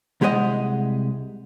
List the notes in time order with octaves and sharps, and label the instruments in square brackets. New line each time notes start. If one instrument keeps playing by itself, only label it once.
[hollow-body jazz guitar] C2 G#3 G4 C5 D#5 F#5